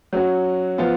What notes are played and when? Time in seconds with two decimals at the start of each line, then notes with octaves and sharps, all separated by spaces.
0.13 F#3 C#4 F#4
0.78 F3 B3 F4